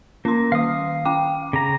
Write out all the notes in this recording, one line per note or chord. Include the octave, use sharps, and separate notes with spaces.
A#3 C#4 C6
D#3 F5 D#6
C#4 G5 D6
C#3 A#5